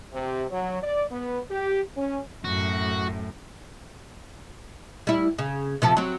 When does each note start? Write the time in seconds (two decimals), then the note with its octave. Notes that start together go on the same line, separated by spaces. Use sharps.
0.12 C3
0.50 F#3
0.81 D5
1.10 B3
1.49 G4
1.96 C#4
2.45 F#2 A2 F#4
5.07 G3 E4
5.38 C#3
5.82 C3 F3 A4
5.97 F#3 C4